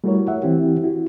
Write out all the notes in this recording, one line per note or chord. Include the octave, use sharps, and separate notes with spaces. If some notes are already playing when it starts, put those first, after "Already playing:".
G3 A3 E4 F#4 A#4 C#5
E5 F#5
E3 C4 E4 G4
E4 F#4